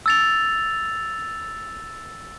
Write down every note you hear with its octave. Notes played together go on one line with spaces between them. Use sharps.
E6 A6 F7